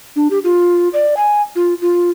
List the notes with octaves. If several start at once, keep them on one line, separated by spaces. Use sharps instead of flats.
D4
G4
F4
D5
G#5
F4
F4